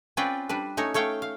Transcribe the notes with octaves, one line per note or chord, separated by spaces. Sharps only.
C4 C#4 F4 B4 D5 G5
G3 D4 B4
A3 C#4 D#4 C#5
A3 C#5 F5 G5
F5